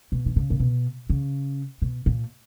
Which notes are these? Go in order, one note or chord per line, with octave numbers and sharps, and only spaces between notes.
B2
D#3
C#3
A#2
B2
C#3
B2
A#2